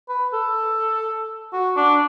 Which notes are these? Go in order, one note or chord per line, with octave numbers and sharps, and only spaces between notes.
B4
A4
F#4
D4